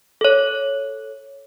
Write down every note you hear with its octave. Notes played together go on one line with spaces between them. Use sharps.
A4 C#5